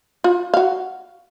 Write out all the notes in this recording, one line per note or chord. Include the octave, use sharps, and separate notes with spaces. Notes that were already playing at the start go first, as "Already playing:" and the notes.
F4
F#4 F5